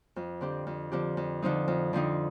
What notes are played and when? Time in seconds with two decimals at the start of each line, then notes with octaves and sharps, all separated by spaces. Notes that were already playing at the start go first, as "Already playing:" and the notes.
0.16 F2
0.41 D3 F3 C4 G4
0.67 F2
0.92 D3 F3 C4 G4
1.17 F2
1.42 D3 F3 C4 D#4
1.68 F2
1.93 D3 F3 C4 D#4